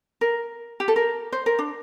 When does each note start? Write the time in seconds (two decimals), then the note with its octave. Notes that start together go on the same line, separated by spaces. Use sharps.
0.21 A#4
0.80 G4
0.88 A4
0.96 A#4
1.33 C5
1.46 A#4
1.59 D4